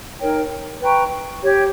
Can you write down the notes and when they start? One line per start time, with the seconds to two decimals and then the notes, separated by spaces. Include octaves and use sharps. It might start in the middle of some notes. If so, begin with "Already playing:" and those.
0.19 D#4 A#4 C#5 G5
0.81 B4 G5 A#5 C#6
1.43 G4 C#5 G5